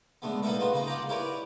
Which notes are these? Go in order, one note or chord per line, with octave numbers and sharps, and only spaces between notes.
D3 G#3 A3 B3
A#3 B3 D#4 A4 A#4 E5
B3 F4 F#4 B4
C#3 A#3 D#4
F4 D5 F#5 G5 A#5
E4 G4 A#4 B4 C#5 D5